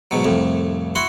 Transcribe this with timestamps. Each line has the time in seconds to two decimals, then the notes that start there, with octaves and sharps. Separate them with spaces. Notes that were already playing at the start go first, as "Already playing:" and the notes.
0.11 G#2 B2 F#3
0.25 C2 F2 A2
0.95 E4 F#4 F#5 C6